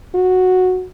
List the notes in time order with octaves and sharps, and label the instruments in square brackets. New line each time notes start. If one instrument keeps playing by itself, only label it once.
[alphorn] F#4